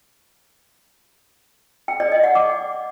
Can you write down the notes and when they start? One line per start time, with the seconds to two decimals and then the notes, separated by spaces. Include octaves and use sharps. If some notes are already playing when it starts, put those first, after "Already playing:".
1.88 G5
2.00 D5
2.12 D#5
2.24 F#5
2.35 D6